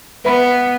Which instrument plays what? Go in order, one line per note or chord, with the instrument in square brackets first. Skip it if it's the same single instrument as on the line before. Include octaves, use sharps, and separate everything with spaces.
[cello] B3 [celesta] B4 E5 B5